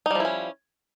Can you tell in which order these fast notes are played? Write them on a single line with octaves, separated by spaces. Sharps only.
D#4 G3 F3 E4 C#4